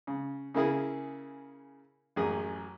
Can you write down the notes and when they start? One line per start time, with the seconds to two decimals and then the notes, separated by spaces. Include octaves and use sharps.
0.07 C#3
0.54 C#3 A#3 E4 G#4
2.16 A1 F#2 G#4